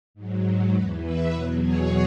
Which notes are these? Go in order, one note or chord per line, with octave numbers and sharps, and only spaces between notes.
G#2 F#3
E2 E3 F#4 B4
B4 E5
E2 B2 F#3 C#5 F#5
G#4 C#5